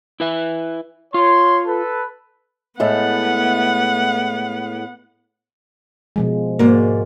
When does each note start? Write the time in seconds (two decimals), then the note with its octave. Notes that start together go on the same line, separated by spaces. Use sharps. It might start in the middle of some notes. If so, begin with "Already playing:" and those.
0.20 E4 B4 E5
1.14 F4 C#5 C6
1.66 A4 B4
2.80 A2 G#3 A3 B3 F#5
6.16 B2 F3 G#3
6.59 G#2 G#3 A#3 F#4 D5